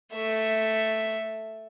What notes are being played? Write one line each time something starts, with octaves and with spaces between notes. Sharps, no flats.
A3 E5